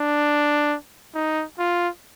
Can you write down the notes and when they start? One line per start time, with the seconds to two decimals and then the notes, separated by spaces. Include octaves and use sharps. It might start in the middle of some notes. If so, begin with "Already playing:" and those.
Already playing: D4
1.14 D#4
1.58 F4